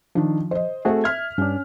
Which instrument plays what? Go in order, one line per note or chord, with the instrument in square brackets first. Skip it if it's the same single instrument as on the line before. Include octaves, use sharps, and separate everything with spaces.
[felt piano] D#3 D4 [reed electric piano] F3
[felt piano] C5 D#5
[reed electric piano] A3 F#4 G#4 [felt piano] C4 A4
[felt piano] E5 F6 B6 [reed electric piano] G#6
[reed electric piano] G2 D4 [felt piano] C#4